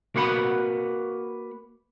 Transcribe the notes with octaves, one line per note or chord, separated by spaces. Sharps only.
A#3 F#4 B4 F#5 B5